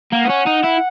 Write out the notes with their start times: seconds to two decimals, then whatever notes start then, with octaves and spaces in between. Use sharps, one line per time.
0.13 A#3 F#5
0.25 B3
0.30 C#4
0.47 D#4
0.64 E4